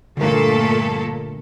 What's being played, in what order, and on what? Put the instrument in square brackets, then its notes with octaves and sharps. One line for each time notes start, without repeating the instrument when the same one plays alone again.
[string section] G1 A#2 A4 [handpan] D3 A#4 [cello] A3